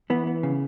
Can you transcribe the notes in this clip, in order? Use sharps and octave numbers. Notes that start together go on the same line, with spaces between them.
E3 B3
B3
C#3